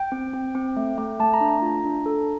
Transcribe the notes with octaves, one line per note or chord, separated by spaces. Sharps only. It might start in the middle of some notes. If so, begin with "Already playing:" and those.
Already playing: G5
C4
C4
C4
A3
A3
A3 A5
A#5
D4
A#5
F4
D4
A4